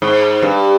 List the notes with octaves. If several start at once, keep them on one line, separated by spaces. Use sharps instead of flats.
G#2
G2